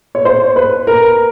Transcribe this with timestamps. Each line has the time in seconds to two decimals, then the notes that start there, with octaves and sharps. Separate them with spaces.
0.15 C#5
0.25 C5
0.56 B4
0.87 A#4